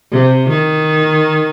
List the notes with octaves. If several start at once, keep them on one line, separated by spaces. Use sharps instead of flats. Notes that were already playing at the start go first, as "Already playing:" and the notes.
C3
D#3